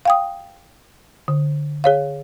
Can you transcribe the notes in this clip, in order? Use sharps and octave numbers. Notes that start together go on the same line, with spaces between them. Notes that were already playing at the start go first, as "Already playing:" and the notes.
F5 G5 D#6
D3
G#4 C#5 F5